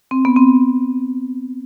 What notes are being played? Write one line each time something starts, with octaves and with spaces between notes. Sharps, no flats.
C4
B3
C4